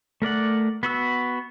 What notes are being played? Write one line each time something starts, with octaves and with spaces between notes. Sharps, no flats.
A3 A#4 D5 F#5
B3 F#4 E6